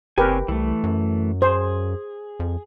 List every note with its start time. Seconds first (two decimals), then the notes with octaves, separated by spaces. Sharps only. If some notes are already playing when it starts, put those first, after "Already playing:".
0.18 F#1 C4 G4 A#4 B4 C#5 G#5
0.48 C2 E3 A3
0.84 F#2
1.42 G#4 C5
2.40 F2